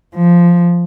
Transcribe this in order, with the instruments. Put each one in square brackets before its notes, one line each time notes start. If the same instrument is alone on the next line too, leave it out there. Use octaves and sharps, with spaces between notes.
[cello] F3